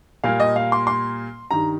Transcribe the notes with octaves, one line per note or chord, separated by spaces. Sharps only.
A#2 G3 A#3 F5
D#5
F5
C6
C6
G2 D#3 G3 A#5